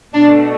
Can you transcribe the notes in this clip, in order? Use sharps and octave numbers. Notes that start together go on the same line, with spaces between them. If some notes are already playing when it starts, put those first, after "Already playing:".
B2 A3 D4